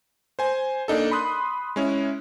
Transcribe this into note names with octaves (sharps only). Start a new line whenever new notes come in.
C5 G#5
A#3 D4 D#4 A4
B5 C6 D#6 F#6
G#3 C#4 E4